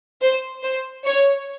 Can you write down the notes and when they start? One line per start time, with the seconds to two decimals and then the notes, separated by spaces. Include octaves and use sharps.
0.22 C5
0.64 C5
1.06 C#5